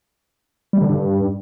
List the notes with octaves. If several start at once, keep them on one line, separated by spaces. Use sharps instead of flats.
G3
D3
G2